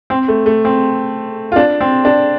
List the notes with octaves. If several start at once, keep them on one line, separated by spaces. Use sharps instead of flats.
C4
A3
A3
C4
F4
D4
C4
D4